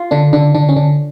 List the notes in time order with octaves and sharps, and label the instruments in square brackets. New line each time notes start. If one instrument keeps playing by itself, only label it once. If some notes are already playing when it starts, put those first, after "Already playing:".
Already playing: [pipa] F4
[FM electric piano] D3 D4
D3 D4
D3 D4
C#4
D3 D4